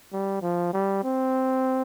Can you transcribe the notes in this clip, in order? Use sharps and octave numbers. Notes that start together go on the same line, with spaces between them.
G3
F3
G3
C4